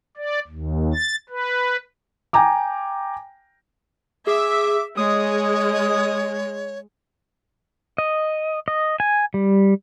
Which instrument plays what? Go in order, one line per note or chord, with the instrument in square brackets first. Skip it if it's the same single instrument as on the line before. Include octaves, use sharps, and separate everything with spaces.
[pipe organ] D5
D#2
A6
B4
[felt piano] G5 G#5 A#5 D6
[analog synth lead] G#4 [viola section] E5 [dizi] D6
[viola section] G#3 [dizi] C#5 [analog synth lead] D#6
[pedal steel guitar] D#5
D#5
G#5
G3